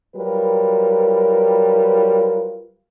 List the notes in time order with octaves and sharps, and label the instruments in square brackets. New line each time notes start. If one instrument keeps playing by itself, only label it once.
[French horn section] F#3 G3 F4 A#4 B4